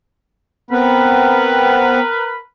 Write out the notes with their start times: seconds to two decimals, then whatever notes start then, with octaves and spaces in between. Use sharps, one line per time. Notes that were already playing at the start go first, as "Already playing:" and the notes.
0.71 B3 C4 A#4 B4